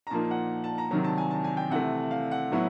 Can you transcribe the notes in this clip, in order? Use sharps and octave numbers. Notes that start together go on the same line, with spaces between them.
A#5
A#2 F3 A#3 D#4 A5
F#5
A5
A#5
C3 D#3 F#3 A#5
A5
G#5
A5
G#5
G5
C3 E3 A3 F#5
F5
F#5
A2 F#3 B3 E4